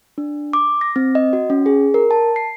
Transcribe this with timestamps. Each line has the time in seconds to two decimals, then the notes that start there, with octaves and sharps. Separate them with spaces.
0.18 D4
0.53 D6
0.81 A#6
0.96 C4
1.15 D#5
1.33 F#4
1.50 C#4
1.66 G#4
1.94 A#4
2.11 A5
2.36 C7